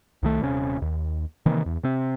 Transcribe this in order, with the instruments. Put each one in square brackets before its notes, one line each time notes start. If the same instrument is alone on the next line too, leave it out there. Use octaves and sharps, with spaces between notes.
[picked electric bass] C2 D#3 A3
D#1 C3 C#4
D#2
C3 D#3 E3 A#3
E2
C3 C4